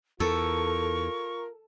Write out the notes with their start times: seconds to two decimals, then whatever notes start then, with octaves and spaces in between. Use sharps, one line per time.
0.20 E2 F4 A4 A#4 C#6